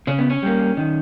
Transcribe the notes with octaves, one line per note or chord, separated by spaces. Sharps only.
C#3 C#4
B3
C#4
G3 A#3
D#3